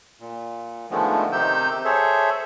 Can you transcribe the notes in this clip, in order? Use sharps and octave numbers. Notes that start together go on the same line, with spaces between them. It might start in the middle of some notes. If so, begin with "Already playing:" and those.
A#2
D3 D#3 F3 G#3 A3 B3
C3 D#3 D#4 G4 E6 G6
G#4 A4 C5 C#5 E5